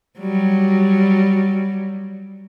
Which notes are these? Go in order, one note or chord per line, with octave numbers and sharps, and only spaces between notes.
F#3 G3